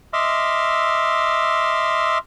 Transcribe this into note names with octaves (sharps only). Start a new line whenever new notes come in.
D#5 E5 C6 D6 E6 F6